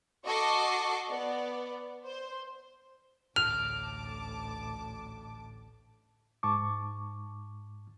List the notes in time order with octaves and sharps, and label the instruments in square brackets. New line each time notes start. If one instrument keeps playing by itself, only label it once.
[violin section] F#4 A4 D#5 C#6 D6 C7
B3 D5
C5
[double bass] A1 A2 [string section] D2 A5 D6 [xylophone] F6 [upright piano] F7
[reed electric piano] G#2 A5 C#6 D6